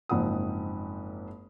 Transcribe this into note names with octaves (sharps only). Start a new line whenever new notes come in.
F#1 G#2 F3 C4 F#5 D#6